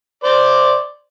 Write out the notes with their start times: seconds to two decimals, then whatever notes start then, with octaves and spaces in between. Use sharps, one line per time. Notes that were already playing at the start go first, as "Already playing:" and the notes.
0.24 C5 D5 D6